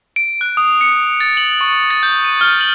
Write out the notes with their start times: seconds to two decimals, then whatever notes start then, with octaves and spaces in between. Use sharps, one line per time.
0.16 D7
0.41 F#6
0.57 D#6
0.81 C#7
1.21 A6
1.37 F#7
1.61 C#6
1.91 A6
2.03 G6
2.24 D#7
2.41 F6
2.61 F#7